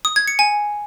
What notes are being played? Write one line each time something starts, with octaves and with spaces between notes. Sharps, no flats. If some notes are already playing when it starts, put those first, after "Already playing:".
D#6
G#6
C#7
G#5